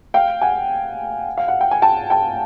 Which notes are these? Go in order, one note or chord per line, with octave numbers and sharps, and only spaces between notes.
F5 G5
F#5 G#5
F5
F#5
G5
G#5
G5 A5
G5 A5